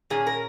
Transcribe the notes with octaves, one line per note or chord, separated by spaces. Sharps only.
A#2 A#3 C#4 G#4
A#4